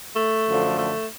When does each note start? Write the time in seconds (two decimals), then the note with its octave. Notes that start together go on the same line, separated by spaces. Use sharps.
0.16 A3
0.47 F#2 D3 F3
0.79 A3